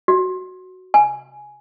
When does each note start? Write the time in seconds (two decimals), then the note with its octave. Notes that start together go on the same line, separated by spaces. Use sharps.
0.08 F#4
0.94 G#5